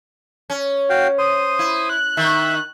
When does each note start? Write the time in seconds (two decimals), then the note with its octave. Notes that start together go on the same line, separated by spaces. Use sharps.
0.50 C#4
0.90 F#4 F5 G5
1.18 C5 D#6
1.59 E4
1.89 F#6
2.17 D#3 D#4 E5